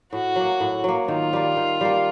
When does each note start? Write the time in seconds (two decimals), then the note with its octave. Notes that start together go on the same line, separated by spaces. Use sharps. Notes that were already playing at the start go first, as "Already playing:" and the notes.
0.13 A2 F#4
0.36 F#3 A#3
0.61 A2
0.84 F#3 A#3
1.08 D#3 F4
1.33 G3 A#3
1.57 D#3
1.81 G3 A#3